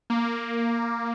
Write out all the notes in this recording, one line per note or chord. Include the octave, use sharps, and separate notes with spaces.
A#3